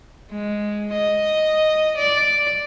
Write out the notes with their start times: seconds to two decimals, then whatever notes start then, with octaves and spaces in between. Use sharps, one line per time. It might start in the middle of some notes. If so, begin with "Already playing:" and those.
0.31 G#3
0.94 D#5
1.97 D5